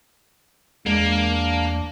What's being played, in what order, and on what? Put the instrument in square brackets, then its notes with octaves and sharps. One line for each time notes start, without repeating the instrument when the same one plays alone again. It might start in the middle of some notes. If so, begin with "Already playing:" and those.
[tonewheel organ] E2 [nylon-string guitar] G#3 [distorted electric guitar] A#3 [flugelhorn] D4